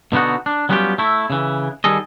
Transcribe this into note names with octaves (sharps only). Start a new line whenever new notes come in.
B2 D3 B3 D#4 F#4
D4
F#3 G3 B3 C#4 F4 G4
A3 E4
C#3 E3
D#3 G3 G#4 A4 D#5